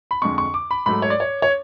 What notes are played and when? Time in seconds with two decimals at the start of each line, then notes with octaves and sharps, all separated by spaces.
0.11 B5
0.22 F2 D3 G#3 C#6
0.38 C#6
0.54 D6
0.71 B5
0.86 G#2 F#3 A3 B5
1.02 C#5
1.10 D5
1.20 C#5
1.42 C#5